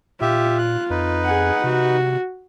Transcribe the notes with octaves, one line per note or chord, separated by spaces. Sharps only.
A#2 F4 G4 E5
F#6
F2 D#4 B4
G#4 F#5
C3 F#4